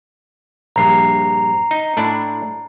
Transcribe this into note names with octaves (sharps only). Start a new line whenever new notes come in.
A#1 G2 A#5 C7
D#4
A2 D4 E4